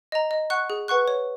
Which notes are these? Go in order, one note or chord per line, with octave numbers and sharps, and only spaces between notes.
D#5 A#5
D#5
F#5 C#6 F#6
G#4
B4 F#5 C#6 F#6
C#5